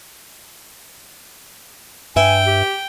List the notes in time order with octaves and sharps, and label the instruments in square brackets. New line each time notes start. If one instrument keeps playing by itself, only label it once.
[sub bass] G2 [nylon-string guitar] B4 E5 [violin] G5 [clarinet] G#5
[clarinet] G4